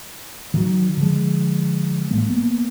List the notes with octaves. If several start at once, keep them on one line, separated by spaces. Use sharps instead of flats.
D#3 F3 F#3
D3 F3 G#3
A1 G#3 A#3
A#3 B3